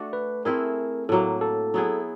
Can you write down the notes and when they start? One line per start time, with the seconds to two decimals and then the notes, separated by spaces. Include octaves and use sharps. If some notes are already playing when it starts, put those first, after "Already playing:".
Already playing: A3 D4 F#4
0.13 B4
0.45 A3 C4 E4 G#4 A#4
1.09 A2 F#3 A#3 A4
1.41 A4
1.74 F#3 B3 E4 G#4